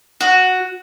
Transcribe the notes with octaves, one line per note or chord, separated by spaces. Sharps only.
F#4